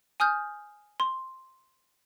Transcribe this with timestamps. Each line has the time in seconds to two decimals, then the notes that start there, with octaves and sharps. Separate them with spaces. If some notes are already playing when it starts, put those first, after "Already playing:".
0.20 G#5 D#6 F6 G6
1.00 C6